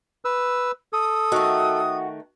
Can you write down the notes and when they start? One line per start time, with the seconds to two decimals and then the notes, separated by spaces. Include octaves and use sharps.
0.25 B4 E6
0.93 A4 D#6
1.32 D#3 A3 F#4